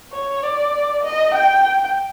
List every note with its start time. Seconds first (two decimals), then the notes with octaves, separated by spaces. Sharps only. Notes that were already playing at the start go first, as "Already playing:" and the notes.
0.12 C#5
0.43 D5
1.03 D#5
1.34 G5